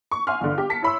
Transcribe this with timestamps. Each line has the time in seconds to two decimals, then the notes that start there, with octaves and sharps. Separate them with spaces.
0.11 C#6
0.27 E5 F#5 G#5 C6 F6
0.41 G1 D3
0.58 G4
0.70 A5 B6 C#7
0.83 E4 C#5 B5 C6 E6